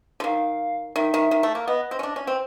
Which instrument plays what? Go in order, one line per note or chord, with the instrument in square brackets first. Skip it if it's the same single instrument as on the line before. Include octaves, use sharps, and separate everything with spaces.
[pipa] D3
[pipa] D#3 [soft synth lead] F5
[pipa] D#3 [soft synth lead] E5
[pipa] D#3
D#3
A3
A#3
[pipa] B3 [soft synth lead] D#5
[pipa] C4
C#4
D4
C#4
C4